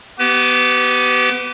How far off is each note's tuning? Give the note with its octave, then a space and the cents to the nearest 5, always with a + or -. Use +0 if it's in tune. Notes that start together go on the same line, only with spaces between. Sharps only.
B3 -5 G4 -25 B4 +25